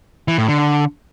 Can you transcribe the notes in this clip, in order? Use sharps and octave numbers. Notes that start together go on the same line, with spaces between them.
E3
A2
D3